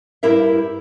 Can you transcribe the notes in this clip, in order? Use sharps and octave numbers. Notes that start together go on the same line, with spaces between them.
G2 E4 G4 A#4 E5